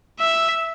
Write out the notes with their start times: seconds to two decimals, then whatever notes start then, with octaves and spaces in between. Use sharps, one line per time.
0.20 E5 E6